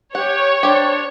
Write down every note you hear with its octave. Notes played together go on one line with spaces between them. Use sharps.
G4 C#5 F#5
D4 G4 C5